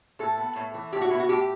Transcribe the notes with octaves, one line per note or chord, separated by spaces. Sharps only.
A2 A4
B3
A2
E3
A2 G4
F#4
B3 E4
F#4
A2 G4